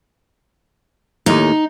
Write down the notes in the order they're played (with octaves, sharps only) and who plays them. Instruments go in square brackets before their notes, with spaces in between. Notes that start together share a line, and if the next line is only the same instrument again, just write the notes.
[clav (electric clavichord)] D#2 A2 [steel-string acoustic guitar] D#4